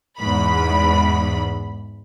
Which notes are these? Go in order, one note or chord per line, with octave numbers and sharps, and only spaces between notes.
E2 G#2 B5